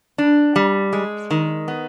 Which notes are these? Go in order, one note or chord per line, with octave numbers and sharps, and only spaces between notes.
D4
G3
G#3
D#3
B3